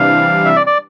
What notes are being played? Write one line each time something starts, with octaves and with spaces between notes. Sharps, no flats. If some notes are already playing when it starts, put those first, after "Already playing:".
Already playing: C3 E3 G3 D4 F5
E5
D5
D5